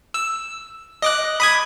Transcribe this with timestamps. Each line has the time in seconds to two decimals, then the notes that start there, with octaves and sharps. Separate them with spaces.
0.14 E6
1.02 D#5 D6 F#6
1.40 B5 D#6 G#6